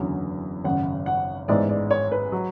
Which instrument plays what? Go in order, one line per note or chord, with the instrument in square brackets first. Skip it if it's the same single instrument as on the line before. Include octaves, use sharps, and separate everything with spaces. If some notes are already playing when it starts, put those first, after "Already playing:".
Already playing: [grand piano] F#1 E2 D3 F#3 C#4
[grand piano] G#1 F#2 C#3 [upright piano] F#5
[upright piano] F#5
[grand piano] A1 G#2 G#3 B3 E4 [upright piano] D5
[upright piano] D5
C#5
B4
[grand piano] F#3